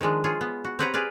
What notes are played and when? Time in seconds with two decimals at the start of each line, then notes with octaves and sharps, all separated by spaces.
0.01 D#3 F3 G#3 D4
0.24 F4 G#4 C#5
0.41 B3
0.65 F#4
0.79 C4 G4 B4 C#5 F#5 A#5
0.94 G#4 B4 D5 F5